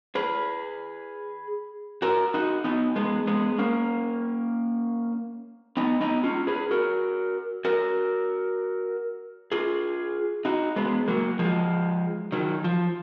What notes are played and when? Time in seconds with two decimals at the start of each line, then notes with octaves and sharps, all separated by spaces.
0.15 G#4 B4
2.02 F#4 A#4
2.34 D#4 F#4
2.64 B3 D#4
2.96 G#3 B3
3.27 G#3 B3
3.58 A#3 C#4
5.77 B3 D#4
6.01 B3 D#4
6.24 C#4 F4
6.47 G#4 B4
6.71 F#4 A#4
7.65 F#4 A#4
9.52 F4 G#4
10.45 D#4 F#4
10.76 G#3 B3
11.08 F#3 A#3
11.39 F3 G#3
12.32 D#3 F#3
12.64 F3